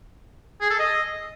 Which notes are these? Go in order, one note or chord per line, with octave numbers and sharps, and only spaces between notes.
G#4
A4
D#5